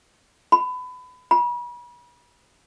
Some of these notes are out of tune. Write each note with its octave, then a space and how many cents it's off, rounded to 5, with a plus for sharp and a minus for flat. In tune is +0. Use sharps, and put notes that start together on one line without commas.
B5 +25
B5 -35